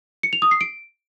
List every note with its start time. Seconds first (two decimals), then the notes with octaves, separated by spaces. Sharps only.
0.23 C#7
0.33 F7
0.42 D#6
0.51 C7
0.61 D7